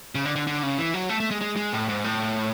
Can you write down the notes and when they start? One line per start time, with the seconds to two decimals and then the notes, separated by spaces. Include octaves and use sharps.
0.15 C#3
0.25 D3
0.36 D3
0.47 D3
0.63 C#3
0.78 E3
0.94 F#3
1.09 A3
1.20 A3
1.31 G#3
1.41 G#3
1.57 G#3
1.72 A2
1.89 G#2
2.04 A2